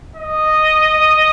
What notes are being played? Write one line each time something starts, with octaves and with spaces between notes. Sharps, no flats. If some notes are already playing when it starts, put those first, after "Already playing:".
D#5